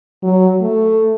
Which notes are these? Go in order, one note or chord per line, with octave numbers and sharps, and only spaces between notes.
F#3
A3